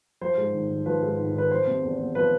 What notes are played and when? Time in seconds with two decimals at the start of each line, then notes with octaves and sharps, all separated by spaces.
0.21 F3 C5
0.38 G#2
0.54 G#1
0.70 G#1
0.86 F3 B4
1.02 G#2
1.19 G#1
1.35 G#1 B4
1.51 F3 C5
1.67 C3
1.83 E2
2.00 B3
2.15 F3 B4